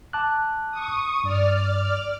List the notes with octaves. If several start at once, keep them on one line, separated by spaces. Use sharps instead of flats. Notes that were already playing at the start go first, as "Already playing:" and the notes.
A5 D6 F#6
C#6 D#6
G2 D5 F6